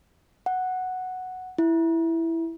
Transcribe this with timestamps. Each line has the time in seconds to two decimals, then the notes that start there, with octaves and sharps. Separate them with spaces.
0.46 F#5
1.58 E4